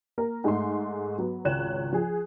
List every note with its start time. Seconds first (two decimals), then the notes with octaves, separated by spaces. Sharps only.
0.18 A#3 A#4
0.44 G#2 G#3 A3 D#4 G#4 C6
1.18 F#3 B3
1.45 G#1 C#2 C#5 F#6 G#6 E7
1.93 F3 G#4